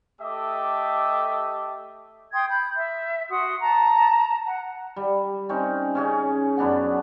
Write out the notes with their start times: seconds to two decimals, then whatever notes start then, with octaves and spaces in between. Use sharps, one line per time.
0.21 A3 G4 A4 D#5 E5 D6
2.33 G5 C6 D#6 G#6
2.49 B5 G6
2.77 E5
3.31 F#4 C6 D#6
3.61 A5 A#5
4.45 F#5
4.96 G3
5.49 C4 C#4 D#4
5.95 C#3 C#4 G#4
6.57 F#2 B3 D4 F#5